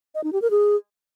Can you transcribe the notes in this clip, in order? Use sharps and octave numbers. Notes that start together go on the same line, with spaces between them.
D#5
D#4
G4
A#4
G#4